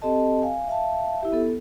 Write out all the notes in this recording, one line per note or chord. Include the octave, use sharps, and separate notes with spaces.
C4 G4 A4 D#5 A5
F5 G#5
E5 F5 A5
E4 G4 E5
B3 A4